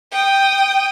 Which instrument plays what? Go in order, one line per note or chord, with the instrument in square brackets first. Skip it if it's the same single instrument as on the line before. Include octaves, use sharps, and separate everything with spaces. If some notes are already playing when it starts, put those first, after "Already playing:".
[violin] G5 D#6